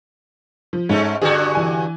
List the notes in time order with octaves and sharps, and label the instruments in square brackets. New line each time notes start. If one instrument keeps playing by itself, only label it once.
[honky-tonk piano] F3
[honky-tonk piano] G#2 [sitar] G#3 A3 C#4
[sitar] G2 D3 F#4 [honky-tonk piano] G#4
[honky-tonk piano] E3 G#5